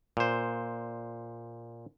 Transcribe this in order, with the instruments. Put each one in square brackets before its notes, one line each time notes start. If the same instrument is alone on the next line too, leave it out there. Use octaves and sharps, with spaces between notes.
[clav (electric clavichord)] A#2 C5